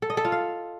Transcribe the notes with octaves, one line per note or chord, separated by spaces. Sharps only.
A4
D#5
A4
F4
F5